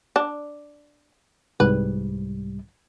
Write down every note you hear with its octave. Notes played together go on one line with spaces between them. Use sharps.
D4
C2 G#2 G3 B4